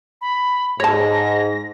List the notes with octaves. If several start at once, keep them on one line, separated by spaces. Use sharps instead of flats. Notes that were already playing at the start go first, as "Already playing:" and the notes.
B5
G#2 C#5 A5 A#6